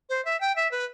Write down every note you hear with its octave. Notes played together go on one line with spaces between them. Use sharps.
C5
E5
G5
E5
B4